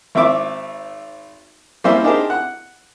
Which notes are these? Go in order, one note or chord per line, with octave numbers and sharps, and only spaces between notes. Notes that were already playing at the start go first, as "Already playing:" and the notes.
G#1 C4 E5 D6
G3 A#3 C#4 E4 C5 E5
D4 D#4 G4 G#4 A#4 C5
F#5